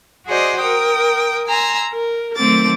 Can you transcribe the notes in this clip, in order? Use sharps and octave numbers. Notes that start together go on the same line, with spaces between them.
F#4 G#4 C5 D5 D#5
A#4 G5 D#6
G#5 A#5 C6 E6
A#4
D#3 F#3 A3 C4 D6 A6